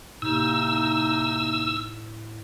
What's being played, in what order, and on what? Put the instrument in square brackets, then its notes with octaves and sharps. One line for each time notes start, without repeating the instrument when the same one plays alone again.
[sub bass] A2 [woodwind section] C3 A#3 D#4 [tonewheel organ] E6